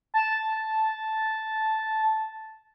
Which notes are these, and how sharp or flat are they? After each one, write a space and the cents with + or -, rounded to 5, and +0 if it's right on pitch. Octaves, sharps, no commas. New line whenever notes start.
A5 -5